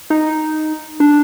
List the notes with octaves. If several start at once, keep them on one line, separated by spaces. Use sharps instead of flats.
D#4
D4